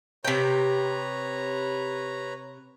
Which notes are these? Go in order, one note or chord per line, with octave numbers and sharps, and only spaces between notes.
C3 B4 C#5 G5 A#5